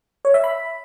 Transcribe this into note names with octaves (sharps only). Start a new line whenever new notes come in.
C#5
E5
B5